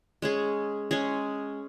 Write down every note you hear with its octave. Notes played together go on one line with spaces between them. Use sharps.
G#3 C#4 G#4
G#3 C#4 G#4